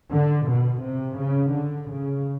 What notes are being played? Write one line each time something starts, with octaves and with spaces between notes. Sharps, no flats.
D3
B2
C3
C#3
D3
C#3